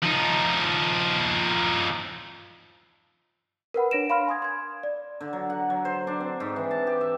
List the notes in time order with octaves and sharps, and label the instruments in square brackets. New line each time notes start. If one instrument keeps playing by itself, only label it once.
[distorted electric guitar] F3 D#4
[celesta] A#4 B4 F#5 B5
D4 C#5 A#6 D7 E7
F5 B5 C6 F6
G#5 C6 D#6 G#6
C6 G#6
D5
[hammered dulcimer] D3
F#3
F#5
F#3
C5
D4
C4
G#2
E3
A5
G4
E5